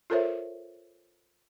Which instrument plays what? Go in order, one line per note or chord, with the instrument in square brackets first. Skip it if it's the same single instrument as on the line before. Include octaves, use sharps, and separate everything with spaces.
[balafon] F4 A4 A#4 C5 C#5 E5